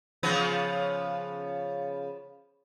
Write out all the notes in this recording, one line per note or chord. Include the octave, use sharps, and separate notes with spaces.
C#3 F3 B3